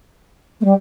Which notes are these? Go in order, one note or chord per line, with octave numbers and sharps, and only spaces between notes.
A3
G3